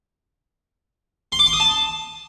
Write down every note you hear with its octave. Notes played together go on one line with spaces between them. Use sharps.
C6
D6
C6
D#6
A5